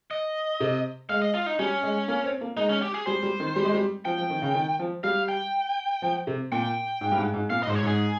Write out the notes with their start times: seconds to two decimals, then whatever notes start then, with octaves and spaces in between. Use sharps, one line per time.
0.11 D#5
0.60 C3
1.09 G#3 F5
1.22 D#5
1.34 F4
1.46 D#4
1.59 G3 C#4
1.83 G#3
2.08 A#3
2.24 C4
2.41 A#3
2.57 G#3 D#4
2.69 C#4
2.82 G4
2.94 G#4
3.06 G3 C5
3.23 G3
3.40 D#3
3.56 G3
3.65 G#3
3.74 G3
4.05 F3 G5
4.18 F3
4.30 D#3
4.42 C#3
4.54 D#3
4.79 F3
5.04 G3 F5
5.29 G5
6.02 F3
6.27 C3
6.52 A#2 G5
7.01 G#2
7.12 G2
7.18 G#2
7.33 G#2
7.50 A#2 F5
7.63 D#5
7.67 G#2 C5
7.75 C#5
7.83 G#2 G#4